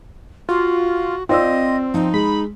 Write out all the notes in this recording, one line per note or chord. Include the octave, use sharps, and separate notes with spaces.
F4 F#4
C4 F4 D5 D#5 E6
F3 D#4
G#3 B5